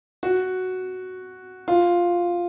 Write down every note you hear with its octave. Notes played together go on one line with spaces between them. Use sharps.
F#4
F4